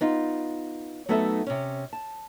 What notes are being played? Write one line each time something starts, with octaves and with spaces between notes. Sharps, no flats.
B3 D#4 F4
F#3 A3 B3 D#4 A4 E5
C3 C#4
A5